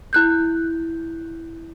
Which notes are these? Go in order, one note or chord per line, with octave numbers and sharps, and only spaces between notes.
E4 F#6 G6